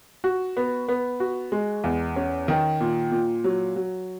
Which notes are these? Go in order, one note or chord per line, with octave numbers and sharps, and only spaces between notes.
F#4
B3
B3
F#4
G#3
E2
C#4
D#3
A#2
A#2
F#3
F#3